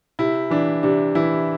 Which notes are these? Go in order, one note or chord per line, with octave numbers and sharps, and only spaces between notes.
C3 E4
E3 D4
C3 D4
E3 E4